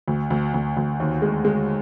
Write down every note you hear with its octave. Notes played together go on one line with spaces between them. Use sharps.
D2
D2
D2
D2
D#2
G#3
G#3